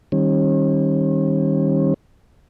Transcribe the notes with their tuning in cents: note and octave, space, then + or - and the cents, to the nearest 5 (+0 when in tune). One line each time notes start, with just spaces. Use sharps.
D#3 +0 G3 +0 C#4 -45